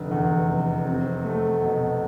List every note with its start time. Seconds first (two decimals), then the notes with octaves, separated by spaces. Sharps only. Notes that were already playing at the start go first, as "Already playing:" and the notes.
Already playing: F1 D3
0.11 E2
0.48 F1
0.86 C4
1.25 A3
1.61 B2